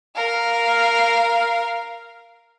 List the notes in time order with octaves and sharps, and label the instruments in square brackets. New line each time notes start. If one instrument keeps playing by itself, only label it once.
[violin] A#4 F5